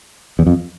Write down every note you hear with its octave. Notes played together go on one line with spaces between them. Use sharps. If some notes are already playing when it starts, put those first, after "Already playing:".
E2
F2